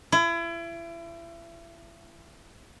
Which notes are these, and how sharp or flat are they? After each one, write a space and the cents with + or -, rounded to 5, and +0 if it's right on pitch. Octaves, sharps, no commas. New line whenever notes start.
E4 +35